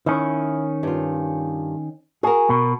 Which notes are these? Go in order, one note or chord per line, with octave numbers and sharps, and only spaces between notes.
D#3 C#4 E4
G2 F4
F#4 G#4 A#4
B2